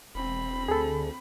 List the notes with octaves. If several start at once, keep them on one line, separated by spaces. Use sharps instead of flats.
E1 C4 B5
D2 G#4 A4